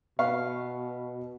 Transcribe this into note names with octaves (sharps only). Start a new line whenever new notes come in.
B2 B3 F5 C#6